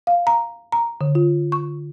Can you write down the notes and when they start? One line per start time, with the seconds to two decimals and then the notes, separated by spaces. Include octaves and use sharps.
0.07 F5
0.27 A#5
0.72 A#5
1.01 D3
1.15 F4
1.52 C#6